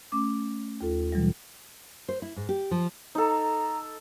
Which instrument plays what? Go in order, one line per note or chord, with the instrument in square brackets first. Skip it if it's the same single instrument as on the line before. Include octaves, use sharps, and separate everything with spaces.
[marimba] A3 C#4 D6
D#2 F4 A4
B2 E3 F#3 G3
[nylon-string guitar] C5
E4
G#2
G4
F3
[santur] D#4 A4 [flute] A#5